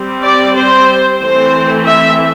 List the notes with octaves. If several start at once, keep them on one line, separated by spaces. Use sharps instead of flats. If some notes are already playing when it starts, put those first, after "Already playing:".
Already playing: G3 C4
D5
C5
E3 A3 C4 C5
E5